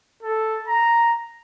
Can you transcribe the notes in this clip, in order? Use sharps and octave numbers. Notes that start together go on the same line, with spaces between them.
A4
A#5